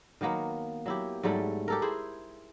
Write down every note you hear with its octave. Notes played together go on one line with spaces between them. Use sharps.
D#3 F#3 A#3 B3
F#3 E4 G4
G#2 F#3 G3 A3
G4 A4 A#4
E4 G#4 C5